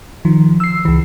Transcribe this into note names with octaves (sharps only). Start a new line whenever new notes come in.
D#3 F3
E6 C7
C#2 E3